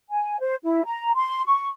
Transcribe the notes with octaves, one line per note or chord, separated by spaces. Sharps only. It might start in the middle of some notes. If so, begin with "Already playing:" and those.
G#5
C5
E4
A#5
C6
C#6